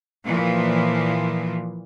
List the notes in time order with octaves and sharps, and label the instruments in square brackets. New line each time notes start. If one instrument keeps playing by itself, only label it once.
[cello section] A#2 E3 F3